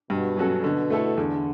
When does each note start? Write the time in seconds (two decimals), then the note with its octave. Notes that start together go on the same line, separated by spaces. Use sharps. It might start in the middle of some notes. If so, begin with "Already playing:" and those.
0.10 G2 B2
0.37 F#3 C#4 F#4 A4
0.63 B2 D3
0.90 A3 E4 A4
1.17 E2 D3